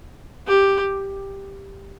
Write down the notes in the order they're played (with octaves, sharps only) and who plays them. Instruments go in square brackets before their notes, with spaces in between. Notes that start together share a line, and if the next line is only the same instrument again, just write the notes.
[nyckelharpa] G4